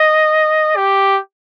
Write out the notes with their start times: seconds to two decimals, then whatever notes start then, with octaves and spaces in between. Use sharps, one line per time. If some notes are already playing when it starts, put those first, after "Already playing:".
Already playing: D#5
0.77 G4